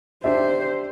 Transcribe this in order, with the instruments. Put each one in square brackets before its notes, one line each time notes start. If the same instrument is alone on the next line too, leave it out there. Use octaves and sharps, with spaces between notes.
[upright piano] D4 G4 E5 [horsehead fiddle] C5